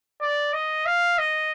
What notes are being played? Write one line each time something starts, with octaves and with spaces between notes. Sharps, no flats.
D5
D#5
F5
D#5